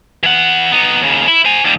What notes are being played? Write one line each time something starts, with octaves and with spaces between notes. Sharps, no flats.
E3 F#5
B3 D#4
D#2 C#3
E4
C5 G#5
D#2 G3